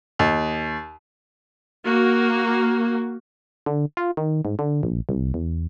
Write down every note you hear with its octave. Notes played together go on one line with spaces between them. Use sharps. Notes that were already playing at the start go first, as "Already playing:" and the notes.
D#2
A#3 F#4
D3
F4
D#3
G#2
D3
A#1
C2
E2